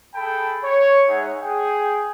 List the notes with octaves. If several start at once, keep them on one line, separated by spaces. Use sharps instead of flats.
G#4 A4 G5 A5 B5
C#5
G#3 D#4 G#4 C#5 E5 F#5
G#4 G5